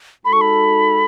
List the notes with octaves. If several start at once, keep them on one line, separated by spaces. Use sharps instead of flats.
G#3 D#4 F#4 A4 B5
C#6
B5